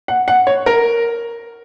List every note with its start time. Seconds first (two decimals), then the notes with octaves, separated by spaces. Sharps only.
0.08 F#5
0.28 F#5
0.47 C#5
0.66 A#4